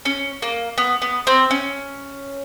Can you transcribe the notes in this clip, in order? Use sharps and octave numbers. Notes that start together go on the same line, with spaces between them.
C#4
A#3
B3
B3
C4
C#4